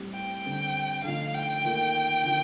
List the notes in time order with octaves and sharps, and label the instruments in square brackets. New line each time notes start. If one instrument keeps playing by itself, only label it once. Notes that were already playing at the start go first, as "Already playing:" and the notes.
Already playing: [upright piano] A2 G3 C4 G4
[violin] G5
[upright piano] D3 G3 C4
[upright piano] D3 F3 A3 D#4 [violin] F5
[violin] G5
[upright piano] D#3 A#3 F4 A4
D3 F3 A#3 D4 F4